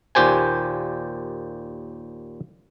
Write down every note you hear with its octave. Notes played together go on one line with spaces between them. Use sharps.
D#2 A#2 G4 C5 G#5